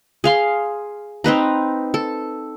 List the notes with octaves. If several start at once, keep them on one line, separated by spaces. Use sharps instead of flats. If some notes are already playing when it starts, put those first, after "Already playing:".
G#4 F5 C6
C4 D#4 B4 A#5
A4